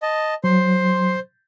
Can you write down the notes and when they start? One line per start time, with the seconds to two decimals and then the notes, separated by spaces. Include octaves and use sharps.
0.02 D#5 A5
0.44 F#3 C5 C6